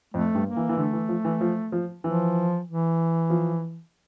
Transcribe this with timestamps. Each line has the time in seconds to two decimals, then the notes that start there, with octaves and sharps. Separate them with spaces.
0.14 F2 A3
0.35 G2
0.46 A#3
0.57 E3
0.69 E3
0.77 D3 A3
0.93 E3
1.09 F3
1.25 E3
1.41 F3
1.72 F3
2.04 E3 F3
2.67 E3
3.30 F3